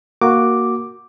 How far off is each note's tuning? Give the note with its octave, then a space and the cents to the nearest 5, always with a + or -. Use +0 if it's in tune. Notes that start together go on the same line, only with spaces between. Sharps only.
A#3 +0 F#4 +0 D6 +0